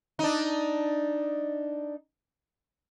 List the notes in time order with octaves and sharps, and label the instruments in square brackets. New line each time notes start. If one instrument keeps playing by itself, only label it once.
[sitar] D4 D#4